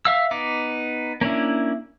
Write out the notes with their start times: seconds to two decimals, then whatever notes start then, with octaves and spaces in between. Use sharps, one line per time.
0.05 E5 F5 E6
0.31 B3 D#4 D6
1.21 A#3 C#4 D4 E4